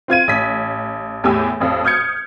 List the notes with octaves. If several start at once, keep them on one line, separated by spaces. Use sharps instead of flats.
C4 F4 G#6 D#7
A1 B6
E2 A2 G4 G#5 E6
A1 F2
D#6 F6 G6 G#6 C#7